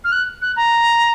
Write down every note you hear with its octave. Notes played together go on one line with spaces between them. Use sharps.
F6
F#6
F#6
A#5